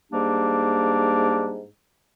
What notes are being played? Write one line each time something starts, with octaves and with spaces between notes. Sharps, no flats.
G#2 G3 A#3 D4 G4